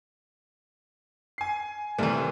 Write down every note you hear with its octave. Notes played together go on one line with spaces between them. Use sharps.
G#5 C7
D#2 C3 E3 G3 A3